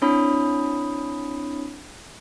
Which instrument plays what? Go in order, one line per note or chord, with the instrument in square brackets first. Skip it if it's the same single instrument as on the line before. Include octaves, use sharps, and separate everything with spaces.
[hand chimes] C4 D4 E4 C#5 B5 D#6